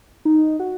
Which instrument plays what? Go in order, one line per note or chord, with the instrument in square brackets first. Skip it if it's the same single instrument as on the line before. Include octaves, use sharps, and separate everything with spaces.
[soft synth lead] D#4
F#4